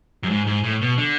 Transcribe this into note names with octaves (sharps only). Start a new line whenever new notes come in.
F#2
G#2
G#2
A2
B2
D3